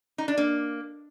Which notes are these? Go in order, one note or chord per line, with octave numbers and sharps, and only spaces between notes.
D#4
D4
A#3